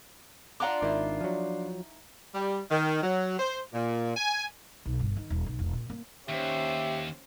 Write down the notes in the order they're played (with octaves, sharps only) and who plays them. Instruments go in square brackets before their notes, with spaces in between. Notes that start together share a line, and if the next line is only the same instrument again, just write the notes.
[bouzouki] D4 F4 D5 [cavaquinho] F#5 A#5 D6
[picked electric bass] G#1 D#3 [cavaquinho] D#4 E4
[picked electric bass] F3 F#3
[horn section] G3
D#3
F#3
C5
A#2
G#5
[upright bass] B1
G1
D#3
D#1
B1
E1
A#2
A#3
[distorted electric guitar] D#2 [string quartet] C#4 C5 [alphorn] G4 [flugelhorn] E5